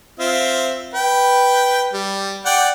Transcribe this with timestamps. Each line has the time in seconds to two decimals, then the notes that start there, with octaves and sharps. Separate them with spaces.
0.20 C4 F4 E5
0.94 B4 G5
1.93 G3
2.46 D5 F#5 G5